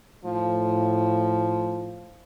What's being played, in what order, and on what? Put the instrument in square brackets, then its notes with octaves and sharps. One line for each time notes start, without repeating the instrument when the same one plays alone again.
[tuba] A2 [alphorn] F3